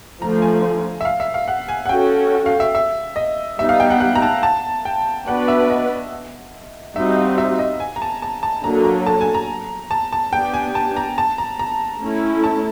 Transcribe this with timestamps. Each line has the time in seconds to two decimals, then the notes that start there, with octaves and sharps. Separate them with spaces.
0.21 D3 F3 A3 A#5
0.42 G#5
1.01 E5
1.05 F5
1.20 E5
1.34 F5
1.48 F#5
1.68 G#5
1.86 F#5
1.89 C#4 F#4 A4 G5
2.46 F5
2.60 E5
2.75 E5
3.16 D#5
3.59 G3 B3 D#4 E5
3.69 F5
3.80 G5
3.90 F#5
4.00 F#5
4.16 A#5
4.22 A5
4.43 A5
4.85 G5
5.27 B3 D4 F#4 B4 D5 F#5
5.48 E5
5.70 D#5
6.96 G3 C4 D#4 F#4 E5
7.16 F5
7.38 E5
7.59 D#5
7.80 G#5
7.96 A#5
8.02 A5
8.22 A5
8.43 A5
8.64 D3 F#3 A#3 A#5
8.85 A#5
9.06 A5
9.21 G#5
9.35 A#5
9.91 A5
10.13 A5
10.33 B3 D4 G4 G5
10.54 G#5
10.75 A5
10.97 A#5
11.18 A5
11.38 A#5
11.59 A#5
12.01 A3 C#4 E4
12.44 A5